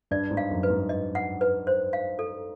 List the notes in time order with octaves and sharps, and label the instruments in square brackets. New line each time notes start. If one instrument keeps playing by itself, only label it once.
[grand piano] G2 [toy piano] D5
[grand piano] G#2
[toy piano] F5
[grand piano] F#2
[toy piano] B4
[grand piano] G#2
[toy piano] D#5
F#5
B4
C5
F5
A4